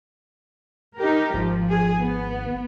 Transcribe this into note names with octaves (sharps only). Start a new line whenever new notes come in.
D#4 G4 A#4
G#1 F3
G#4
B3